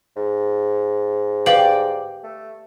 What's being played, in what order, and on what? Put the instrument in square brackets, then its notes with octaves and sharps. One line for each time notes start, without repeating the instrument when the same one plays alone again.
[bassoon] G#2
[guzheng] G4 D5 [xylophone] B4 F5 F#7
[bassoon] A3